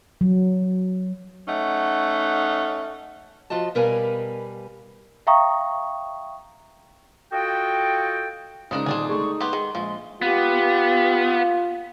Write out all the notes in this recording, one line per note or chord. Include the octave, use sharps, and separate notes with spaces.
F#3
A3 C#4 D#4 F#5
F3 F4 F#4 D#5 A5
B2 G3 A#4 B4 F5 G#5
E5 F5 G5 A#5 C#6 D#6
F4 F#4 A4 D#5 G5
C#2 C#3 F3 D4 D#4 A#4 D#6
D#1 C4 D4 G#4
G#3 A3 C#6
B3 G4 C6
D#3 G#3
A#1 F3 G#3
B3 F4 G4